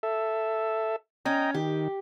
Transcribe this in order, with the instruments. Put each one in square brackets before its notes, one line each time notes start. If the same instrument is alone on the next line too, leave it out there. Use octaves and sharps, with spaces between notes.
[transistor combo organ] A4 E5
[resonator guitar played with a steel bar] C#4 [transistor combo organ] D#5 G5 A#5
[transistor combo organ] D#3 [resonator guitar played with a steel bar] G4